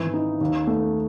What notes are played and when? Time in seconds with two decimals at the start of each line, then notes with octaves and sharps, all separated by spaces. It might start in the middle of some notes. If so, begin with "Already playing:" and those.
Already playing: G#1 E3
0.14 D#4
0.41 D#2
0.67 A3